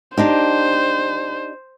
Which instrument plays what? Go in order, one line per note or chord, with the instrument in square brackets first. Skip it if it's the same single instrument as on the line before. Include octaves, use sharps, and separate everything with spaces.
[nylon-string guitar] D4 D#4 G4 [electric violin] C5